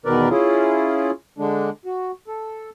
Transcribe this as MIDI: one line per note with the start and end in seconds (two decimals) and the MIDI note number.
0.05 0.29 40
0.05 0.29 47
0.05 0.29 51
0.05 0.29 70
0.05 0.29 71
0.05 0.29 74
0.30 1.11 61
0.30 1.11 64
0.30 1.11 65
0.30 1.11 68
1.38 1.70 50
1.38 1.70 56
1.38 1.70 62
1.85 2.11 66
2.28 2.70 69